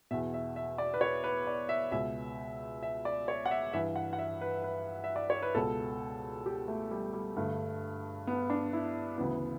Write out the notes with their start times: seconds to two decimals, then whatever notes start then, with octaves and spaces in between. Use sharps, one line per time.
0.11 E2 B2 E5
0.34 E5
0.56 E5
0.78 D5
0.94 B4
1.01 C#5
1.24 B4
1.47 D5
1.69 E5
1.92 C#2 B2 E5
2.83 E5
3.05 D5
3.28 C#5
3.46 F#5
3.51 E5
3.73 G2 E3 E5
3.96 F#5
4.13 F#5
4.19 E5
4.41 B4
4.64 B4
5.04 E5
5.16 D5
5.30 C#5
5.42 B4
5.55 C#2 B2 A4
6.46 G4
6.68 A3
6.91 G3
7.13 G3
7.37 G2 D3 A3
8.27 B3
8.50 D4
8.73 E4
9.18 D2 C#3 E3 B3